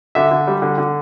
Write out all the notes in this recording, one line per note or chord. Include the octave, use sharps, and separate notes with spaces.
D3 E5
D3
G3
D3
D3